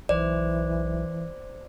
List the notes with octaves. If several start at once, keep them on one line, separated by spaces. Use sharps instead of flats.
B1 E3 C5 D5